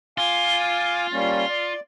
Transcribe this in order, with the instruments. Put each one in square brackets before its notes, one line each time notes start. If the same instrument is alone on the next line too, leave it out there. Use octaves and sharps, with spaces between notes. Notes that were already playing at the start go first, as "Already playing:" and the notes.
[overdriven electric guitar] F4 [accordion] F5 G#5 D6
[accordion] G3 A#3 C#4
D5